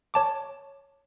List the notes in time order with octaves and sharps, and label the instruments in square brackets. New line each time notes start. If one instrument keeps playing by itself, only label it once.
[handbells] C#5 A5 D6